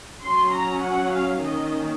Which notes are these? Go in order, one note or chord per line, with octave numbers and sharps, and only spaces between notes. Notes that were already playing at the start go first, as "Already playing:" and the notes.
F#3 C#4 C6
A#5
F#5
F5
D#3 A#3 C#4 D#5